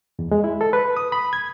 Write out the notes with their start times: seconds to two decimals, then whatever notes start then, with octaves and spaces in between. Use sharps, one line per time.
0.19 E2
0.31 G#3
0.44 E4
0.61 A4
0.73 B4
0.97 D#6
1.12 B5
1.33 G#6